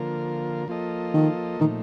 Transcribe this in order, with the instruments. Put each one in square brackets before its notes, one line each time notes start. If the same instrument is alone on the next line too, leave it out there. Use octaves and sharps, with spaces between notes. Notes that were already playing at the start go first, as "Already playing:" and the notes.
Already playing: [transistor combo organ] D3 F3 A#3 F4 A#4
F3 A#3 F4 A4 D#5
[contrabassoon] D#3
[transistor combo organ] A#2 F3 A3 D#4 [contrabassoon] D#3